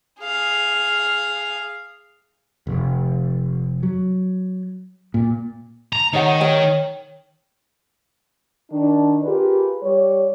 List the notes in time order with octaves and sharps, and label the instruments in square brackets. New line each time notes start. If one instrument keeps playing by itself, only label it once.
[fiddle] G#4 F5
[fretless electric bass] F1
F#3
A#2
[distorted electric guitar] A#5
[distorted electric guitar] D#3 [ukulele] D#4 C#5 F#5
[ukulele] C#5 G5
[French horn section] D#3 D4
F4 G4 G#4 A#4 B4
G3 C#5